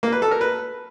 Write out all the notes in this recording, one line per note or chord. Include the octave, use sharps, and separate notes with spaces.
A#3
B4
A4
A#4
B4